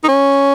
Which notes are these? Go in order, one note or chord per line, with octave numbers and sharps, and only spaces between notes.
D#4
C#4